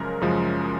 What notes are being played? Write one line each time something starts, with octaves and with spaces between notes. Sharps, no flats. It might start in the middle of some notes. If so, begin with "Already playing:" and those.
Already playing: F#2 C#3 F3 G#3 A#4
F#2 C#3 F3 G#3